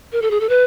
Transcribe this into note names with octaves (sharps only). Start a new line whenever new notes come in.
A#4
A4
G#4
A4
B4